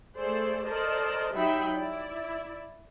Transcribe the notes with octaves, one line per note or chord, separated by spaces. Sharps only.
A3 G#4 A4 C5 D5
A4 A#4 C5 D5 D#5 A5
F#3 D#4 G4 E5 G5 B5
E4 D5